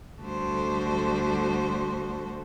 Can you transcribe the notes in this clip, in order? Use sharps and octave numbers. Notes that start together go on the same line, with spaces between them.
D2 G3 F#4 A4 C5